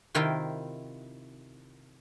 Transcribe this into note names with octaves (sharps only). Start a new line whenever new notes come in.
C3 D#3 E4 F4 A#4 G5